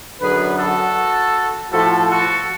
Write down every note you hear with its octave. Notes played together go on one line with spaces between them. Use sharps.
F#2 D3 F#3 G#4 B4
F#4 A4
A2 F3 F#4 A4
F#4 A4